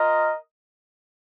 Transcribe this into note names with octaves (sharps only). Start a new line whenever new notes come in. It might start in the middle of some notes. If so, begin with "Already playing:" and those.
Already playing: F4 A#4 D#5